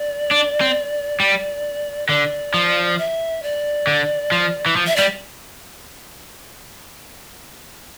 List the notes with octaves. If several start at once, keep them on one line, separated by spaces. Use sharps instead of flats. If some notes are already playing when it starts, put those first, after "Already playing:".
Already playing: D5
D4
C4
G3
D3 D5
F3
E5
D5
D3
F3
E3
F3
E5
G3 D5